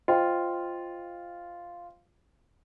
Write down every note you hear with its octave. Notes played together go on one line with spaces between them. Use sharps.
F4 C5 D#5 G5